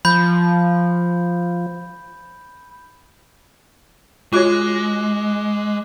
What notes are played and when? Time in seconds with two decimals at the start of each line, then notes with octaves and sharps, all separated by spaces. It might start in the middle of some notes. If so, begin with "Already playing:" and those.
0.05 F3 B5 G6
4.33 G#3 F4 F#4 C#5 D6 F#6